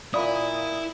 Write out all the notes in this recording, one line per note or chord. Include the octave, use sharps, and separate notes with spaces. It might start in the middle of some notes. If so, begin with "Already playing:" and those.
A#2 E4 D5 B5 D#6